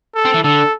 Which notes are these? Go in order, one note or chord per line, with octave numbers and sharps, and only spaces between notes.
A4
C4
E3
D3 A4